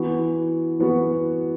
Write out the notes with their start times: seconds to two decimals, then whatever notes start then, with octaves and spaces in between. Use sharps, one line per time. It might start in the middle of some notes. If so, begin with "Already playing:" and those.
Already playing: E3 B3 F#4
0.79 E3 B3 F#4